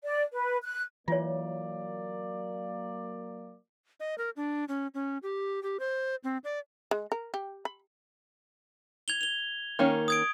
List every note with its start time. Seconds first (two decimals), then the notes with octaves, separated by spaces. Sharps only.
0.03 D5
0.32 B4
0.63 F#6
1.08 E3 F#3 A#3 F4 C#5 D5
4.00 D#5
4.18 A#4
4.36 D4
4.68 C#4
4.94 C#4
5.23 G4
5.63 G4
5.80 C5
6.24 C4
6.44 D5
6.91 G#3
7.12 A#4
7.34 G4
7.65 B5
9.08 G#6 F7 G7
9.21 F7 G7
9.79 D#3 A#3 C#4
10.08 D#6 G#6 D7